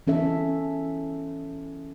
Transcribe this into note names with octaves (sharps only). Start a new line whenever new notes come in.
E3 C#4 A4 E5